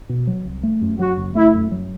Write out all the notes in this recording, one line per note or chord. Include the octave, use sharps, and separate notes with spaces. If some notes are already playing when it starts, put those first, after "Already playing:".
B2
F#3
C2
A3
F#2
F#3 F#4
F#1
A3 E4
F#2
F#3